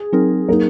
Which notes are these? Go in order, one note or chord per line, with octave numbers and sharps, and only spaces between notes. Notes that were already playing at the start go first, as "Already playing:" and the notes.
Already playing: G#4
F#3 C4 D#4 A#4
F#3 A#3 D#4 A#4